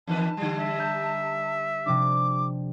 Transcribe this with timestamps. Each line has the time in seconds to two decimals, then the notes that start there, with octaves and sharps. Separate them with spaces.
0.07 E2 D#3 B4 A5
0.37 D3 G3
0.59 E5
0.78 D#5 A#5 G6
1.86 C3 F3 D4 D6